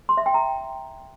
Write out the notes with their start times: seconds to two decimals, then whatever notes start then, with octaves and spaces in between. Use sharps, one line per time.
0.09 C6
0.17 E5
0.26 G5
0.34 A#5